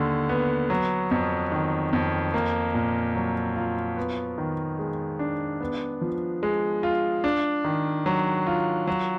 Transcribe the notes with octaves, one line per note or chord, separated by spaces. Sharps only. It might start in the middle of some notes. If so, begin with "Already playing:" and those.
Already playing: D#2 D3
B3
F#3
F2
D#3
F2
A#3
A#2
F#3
F4
B3
D#3
G#3
D4
B3
F3
G#3
F4
D4
D#3
F#3
F4
F#3